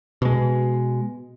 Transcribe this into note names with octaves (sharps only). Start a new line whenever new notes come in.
B2 G#3